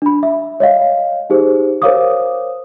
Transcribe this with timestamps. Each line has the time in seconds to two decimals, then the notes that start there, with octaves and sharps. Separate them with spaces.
0.02 D4 B5
0.23 E5
0.60 C#5 D#5 F5
1.30 D#4 G4 G#4 C5
1.82 A#4 C5 C#5 F5 D6 D#6